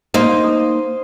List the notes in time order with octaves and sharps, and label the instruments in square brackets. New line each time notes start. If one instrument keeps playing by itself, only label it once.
[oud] A#3 D#4 [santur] C5
[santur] D#6